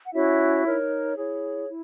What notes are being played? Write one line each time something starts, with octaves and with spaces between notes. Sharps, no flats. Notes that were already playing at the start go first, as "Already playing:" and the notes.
F#5
C#4 E4 F#4 C#5 E5
D#4 A#4 C#5
E4 G#4 C#5
E4